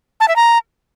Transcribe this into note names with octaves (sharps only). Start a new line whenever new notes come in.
A5
E5
A#5